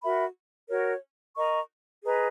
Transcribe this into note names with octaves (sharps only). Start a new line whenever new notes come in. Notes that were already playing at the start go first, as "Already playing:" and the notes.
F#4 A#4 E5 B5
F#4 A#4 C#5
A#4 D#5 A#5 C#6
G#4 B4 D#5 A#5